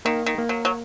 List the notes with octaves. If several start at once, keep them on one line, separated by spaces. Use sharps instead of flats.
D#3 A#3
D#3
A#3
F#3
F#3